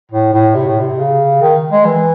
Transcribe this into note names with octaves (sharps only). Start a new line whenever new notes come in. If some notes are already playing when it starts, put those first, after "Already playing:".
A2
A2
C3
A2
C3
C#3
D#3
G#3
E3